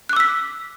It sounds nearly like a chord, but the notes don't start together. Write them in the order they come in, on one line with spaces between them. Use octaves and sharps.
F#6 D6 E6 B6